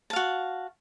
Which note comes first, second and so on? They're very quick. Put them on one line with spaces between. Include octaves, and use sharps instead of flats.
A5 F5 F#4